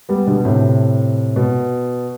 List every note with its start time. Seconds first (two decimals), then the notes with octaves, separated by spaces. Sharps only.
0.09 G3 B3
0.27 B2 D3
0.45 A2 C3
1.36 B2